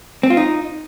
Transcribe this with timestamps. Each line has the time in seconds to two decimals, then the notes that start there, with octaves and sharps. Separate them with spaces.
0.23 C4
0.30 F4
0.37 D#4